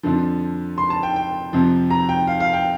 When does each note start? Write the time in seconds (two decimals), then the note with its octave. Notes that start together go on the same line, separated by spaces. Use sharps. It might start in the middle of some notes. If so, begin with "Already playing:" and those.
0.03 F2 D3 F3
0.78 C6
0.90 A5
1.03 G5
1.16 G5
1.53 F2 C3 F3
1.90 A#5
2.09 G5
2.27 F5
2.40 F5
2.53 G5